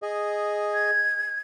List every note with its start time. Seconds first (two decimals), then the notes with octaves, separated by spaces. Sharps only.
0.02 G#4 D#5
0.73 G#6